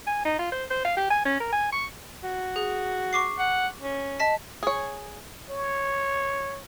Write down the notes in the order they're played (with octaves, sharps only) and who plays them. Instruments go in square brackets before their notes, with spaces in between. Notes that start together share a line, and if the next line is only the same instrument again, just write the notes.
[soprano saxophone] G#5
D#4
F4
C5
C5
F5
G4
G#5
C#4
A#4
G#5
C#6
F#4
[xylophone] G#4
C#6 D6 C7
[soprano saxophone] F#5
C#4
[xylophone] D#5 A5 B6
[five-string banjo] G#4 C#5
[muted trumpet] C#5